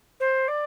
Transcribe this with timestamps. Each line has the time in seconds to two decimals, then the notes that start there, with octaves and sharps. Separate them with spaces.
0.20 C5
0.48 D5